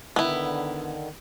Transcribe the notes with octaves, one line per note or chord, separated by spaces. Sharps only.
D3 D#3 B3 E4